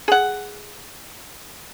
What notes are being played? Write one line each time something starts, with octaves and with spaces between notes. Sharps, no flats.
G#4 F#5